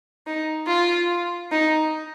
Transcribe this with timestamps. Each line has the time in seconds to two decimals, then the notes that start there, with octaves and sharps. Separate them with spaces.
0.27 D#4
0.68 F4
1.52 D#4